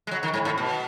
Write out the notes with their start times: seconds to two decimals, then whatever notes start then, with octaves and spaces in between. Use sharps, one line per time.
0.07 G#3
0.11 F#3
0.23 D#3
0.34 G#2
0.45 A2
0.58 B2